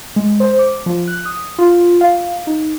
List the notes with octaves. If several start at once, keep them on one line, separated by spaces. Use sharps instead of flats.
G#3
C5
D6
F3
F#6
D#6
F4
F5
D#4